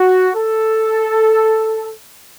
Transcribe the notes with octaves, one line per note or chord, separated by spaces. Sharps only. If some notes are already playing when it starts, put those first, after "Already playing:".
Already playing: F#4
A4